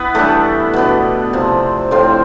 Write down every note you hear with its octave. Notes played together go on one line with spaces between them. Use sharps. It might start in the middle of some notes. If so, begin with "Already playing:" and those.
Already playing: B3 E4 B4
E3 G3 A3 D4 A4
B2 B3 D4
C3 F3 C4
A2 F3 C4 F4